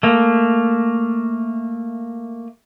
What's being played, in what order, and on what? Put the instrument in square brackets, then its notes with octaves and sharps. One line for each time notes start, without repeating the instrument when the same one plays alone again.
[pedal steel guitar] A3 A#3